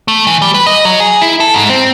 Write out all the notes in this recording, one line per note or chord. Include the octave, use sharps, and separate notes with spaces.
A3
E3
G3
B4
D#5
F#3
G#4
E4
A4
G#2
C4